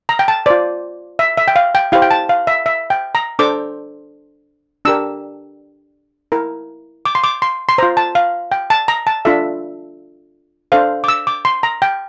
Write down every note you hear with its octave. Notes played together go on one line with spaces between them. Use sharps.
A#5
G5
A5
F4 C5 D5
E5
E5
G5
F5
G5
E4 G4 C5 F5
G5
A5
F5
E5
E5
G5
A#5
D4 A4 C5 D6
D4 G4 A#4 E6
E4 A#4
D6
C6
D6
C6
C6
F4 C5 A#5
A5
F5
G5
A5
A#5
A5
D4 F4 A4 E5
D4 A4 C5 F5
D6
E6
D6
C6
A#5
G5